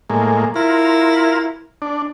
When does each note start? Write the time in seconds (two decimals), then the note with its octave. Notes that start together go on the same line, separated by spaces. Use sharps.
0.10 A2 G#3 A#3
0.56 E4 F4 A#4
1.82 D4